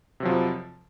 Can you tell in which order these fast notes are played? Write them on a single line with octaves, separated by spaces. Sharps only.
C3 F#3 F3 F2